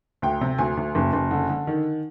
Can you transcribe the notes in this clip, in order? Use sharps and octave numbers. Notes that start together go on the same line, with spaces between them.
D2 G5
C3
D2 G#5
D2
F#1
F#1
D3
D3
D#3